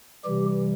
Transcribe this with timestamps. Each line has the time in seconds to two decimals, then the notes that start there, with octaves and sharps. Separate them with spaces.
0.25 C3 E3 G3 G4